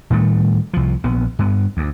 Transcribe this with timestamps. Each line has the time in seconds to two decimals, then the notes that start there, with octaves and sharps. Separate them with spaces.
0.10 A2 D#3 G3 A3
0.73 C2 F3
1.04 A#1 B3
1.39 G2 B3
1.77 D2